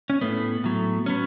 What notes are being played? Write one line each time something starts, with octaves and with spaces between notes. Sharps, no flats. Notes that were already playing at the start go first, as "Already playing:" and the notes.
C#4
A2 A3 B3
A2 F#3 A3
F#3 B3 C#4